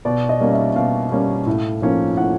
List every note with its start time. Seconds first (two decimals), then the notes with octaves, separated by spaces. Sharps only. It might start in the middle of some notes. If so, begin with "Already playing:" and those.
0.05 B2 D5
0.29 D#5
0.40 G3 A#3 C#4
0.52 E5
0.76 B2 F5
1.11 G3 A#3 C#4
1.46 A2
1.82 F3 A#3 C#4
2.17 A2 F#5